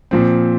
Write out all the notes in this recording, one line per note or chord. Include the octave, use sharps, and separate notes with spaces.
A#2 F3 C4